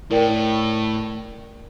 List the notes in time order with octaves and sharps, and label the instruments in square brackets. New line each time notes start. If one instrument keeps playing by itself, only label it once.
[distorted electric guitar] A2 [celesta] E4 A#4 D5 G5